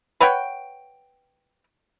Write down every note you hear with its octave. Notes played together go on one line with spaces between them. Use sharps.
B4 C#5 F#5 G5